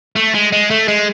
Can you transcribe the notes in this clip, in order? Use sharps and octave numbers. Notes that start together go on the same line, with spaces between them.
A3
G#3
G#3
A3
G#3